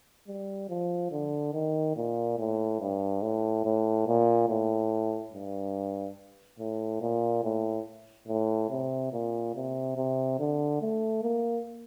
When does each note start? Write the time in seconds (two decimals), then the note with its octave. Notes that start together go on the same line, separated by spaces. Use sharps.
0.28 G3
0.69 F3
1.12 D3
1.53 D#3
1.96 A#2
2.39 A2
2.81 G2
3.22 A2
3.65 A2
4.07 A#2
4.49 A2
5.33 G2
6.59 A2
7.02 A#2
7.44 A2
8.28 A2
8.70 C3
9.13 A#2
9.55 C3
9.97 C3
10.39 D3
10.81 A3
11.23 A#3